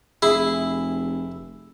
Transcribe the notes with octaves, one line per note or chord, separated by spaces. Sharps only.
F1 E4 G#4